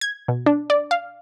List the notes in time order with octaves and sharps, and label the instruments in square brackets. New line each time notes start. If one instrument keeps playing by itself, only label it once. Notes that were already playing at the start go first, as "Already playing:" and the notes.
[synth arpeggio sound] G#6
B2
D4
D5
F5